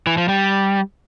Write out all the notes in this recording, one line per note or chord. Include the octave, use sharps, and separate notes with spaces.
E3
F3
G3